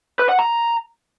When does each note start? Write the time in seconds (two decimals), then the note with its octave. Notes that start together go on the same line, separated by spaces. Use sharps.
0.19 B4
0.29 F#5
0.39 A#5